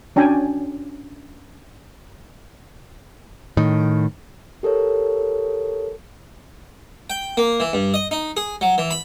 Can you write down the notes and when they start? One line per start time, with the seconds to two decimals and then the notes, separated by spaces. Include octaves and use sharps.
0.16 C#4 D4 F#4 G5 G#5
3.57 A2 D#3
4.63 G4 A4 A#4 C#5
7.10 G5
7.37 A#3
7.60 E3
7.73 G2
7.94 D#5
8.11 D#4
8.37 G#4
8.61 F#3
8.78 E3
8.91 B5